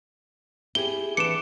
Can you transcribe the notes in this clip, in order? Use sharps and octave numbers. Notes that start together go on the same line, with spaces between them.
E4 G4 G#4 G7
E3 D4 B4 D6 C#7 E7